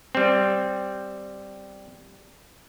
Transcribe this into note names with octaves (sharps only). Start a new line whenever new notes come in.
G3 C4